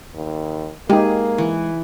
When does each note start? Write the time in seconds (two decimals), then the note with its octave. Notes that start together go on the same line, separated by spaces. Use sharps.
0.14 D#2
0.90 G#3 A#3 D#4 G4 G#4
1.38 E3